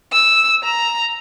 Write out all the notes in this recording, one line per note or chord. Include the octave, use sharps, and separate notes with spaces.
E6
A#5